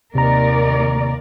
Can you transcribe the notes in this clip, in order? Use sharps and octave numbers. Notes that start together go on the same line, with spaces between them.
D#2 C3 A#4 D5 A#5